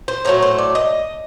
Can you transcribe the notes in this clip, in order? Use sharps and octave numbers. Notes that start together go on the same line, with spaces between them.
C5
A2 F#3 A3 A#4
C5
D5
D#5